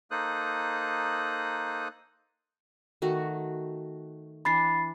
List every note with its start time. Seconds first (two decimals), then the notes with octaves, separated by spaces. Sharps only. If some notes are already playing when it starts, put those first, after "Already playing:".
0.11 A#3 D#4 A4 C5 D#6 F#6
3.02 D#3 A3 F#4
4.45 E3 D4 B5 A6 C7